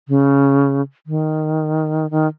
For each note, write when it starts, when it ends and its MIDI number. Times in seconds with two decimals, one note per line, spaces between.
0.09 0.81 49
1.07 2.10 51
2.11 2.27 51